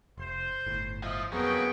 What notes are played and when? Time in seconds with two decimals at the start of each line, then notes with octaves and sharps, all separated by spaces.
0.18 F1 C5 C6
0.66 G1 A2
1.03 F3 D#5 E5
1.33 F2 F#3 A#3 B3 G#4 B4 G5 C#6